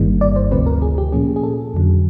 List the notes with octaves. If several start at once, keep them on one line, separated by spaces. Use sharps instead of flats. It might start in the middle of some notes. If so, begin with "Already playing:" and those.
Already playing: G1 G2 D#3 G3 A#3
D5
C5
D2 C3 F3 A3 C4 B4
A#4
G#4
G4
A#2 F3 A#3 C#4 G#4
G#4
A4
F2 D3 F#3